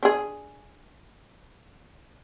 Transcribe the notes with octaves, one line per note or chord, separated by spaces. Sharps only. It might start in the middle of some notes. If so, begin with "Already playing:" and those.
D4 G#4